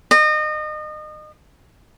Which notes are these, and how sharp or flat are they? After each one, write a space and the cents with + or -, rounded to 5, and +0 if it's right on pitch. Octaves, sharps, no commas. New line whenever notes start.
D#5 -30